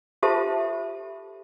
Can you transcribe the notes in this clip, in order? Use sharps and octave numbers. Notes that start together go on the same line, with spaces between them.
F4 G4 A4 C5 E5 A5